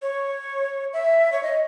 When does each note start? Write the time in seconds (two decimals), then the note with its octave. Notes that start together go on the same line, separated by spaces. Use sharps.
0.02 C#5
0.93 E5
1.32 C#5
1.43 D#5